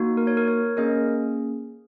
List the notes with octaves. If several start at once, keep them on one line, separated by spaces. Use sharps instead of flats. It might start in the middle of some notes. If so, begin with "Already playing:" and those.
Already playing: A#3 D#4 F#4
A#4
C#5
A#4
C#5
A#3 C#4 G#4 A#4 D#5